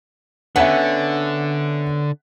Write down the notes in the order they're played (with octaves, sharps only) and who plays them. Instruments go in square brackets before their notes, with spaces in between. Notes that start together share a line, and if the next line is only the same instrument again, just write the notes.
[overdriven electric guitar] D3 [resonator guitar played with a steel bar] B3 C#4 [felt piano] E5 F#5